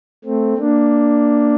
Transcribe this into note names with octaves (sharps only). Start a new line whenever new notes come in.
A3 C4
A#3 D4